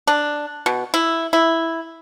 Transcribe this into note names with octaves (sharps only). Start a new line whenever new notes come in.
D4
B2
E4
E4